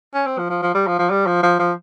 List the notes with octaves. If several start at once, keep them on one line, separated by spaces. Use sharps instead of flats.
C#4
C4
F3
F3
F3
G3
F3
F3
G3
F3
F3
F3